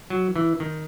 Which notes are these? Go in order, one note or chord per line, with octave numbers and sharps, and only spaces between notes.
F#3
E3
D#3